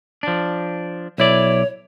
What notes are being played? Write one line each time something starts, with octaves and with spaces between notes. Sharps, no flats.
F3 D4
B1 E4 C#5 D5